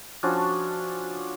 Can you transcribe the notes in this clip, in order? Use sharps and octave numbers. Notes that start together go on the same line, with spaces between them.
F3 C#4 D4 F#4